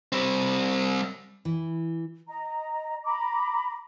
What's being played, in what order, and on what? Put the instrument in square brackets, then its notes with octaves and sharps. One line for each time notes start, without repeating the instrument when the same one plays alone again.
[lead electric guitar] G3 C4
[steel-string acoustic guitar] E3
[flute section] D#5 A#5
A#5 B5 D6